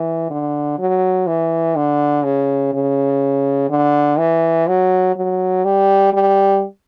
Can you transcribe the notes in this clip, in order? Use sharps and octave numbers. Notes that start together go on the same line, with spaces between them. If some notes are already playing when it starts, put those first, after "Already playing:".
Already playing: E3
D3
F#3
E3
D3
C#3
C#3
D3
E3
F#3
F#3
G3
G3